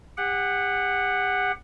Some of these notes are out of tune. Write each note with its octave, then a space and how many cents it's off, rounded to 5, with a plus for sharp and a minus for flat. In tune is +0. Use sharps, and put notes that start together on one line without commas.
G4 +40 F#5 +0